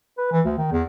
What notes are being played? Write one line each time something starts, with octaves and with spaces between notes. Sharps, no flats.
B4
E3
D2
D#3
E2